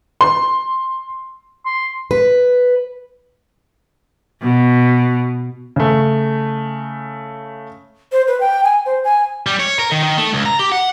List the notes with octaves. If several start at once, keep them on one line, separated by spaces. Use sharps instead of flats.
C6
C6
B4
B2
C#3 A3
C5
B4
G5
G#5
C5
G#5
G3
C#5
A#4
D#3
D#3
A3
C#2
A#5
G4
F#5